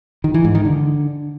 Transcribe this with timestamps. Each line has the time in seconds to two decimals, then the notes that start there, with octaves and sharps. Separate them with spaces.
0.24 D#3
0.34 E3
0.45 G#2
0.55 D#3
0.65 D3